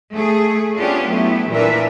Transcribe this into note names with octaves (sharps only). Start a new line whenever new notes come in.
A3 G#4
B3 C#4 D4 F4 G4
F#3 A3 B3 E4
A#2 E3 D4 A#4 B4 E5